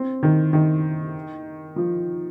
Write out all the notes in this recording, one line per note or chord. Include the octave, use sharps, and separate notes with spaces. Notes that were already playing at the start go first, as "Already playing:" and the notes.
Already playing: C4
D#3
D#3
F3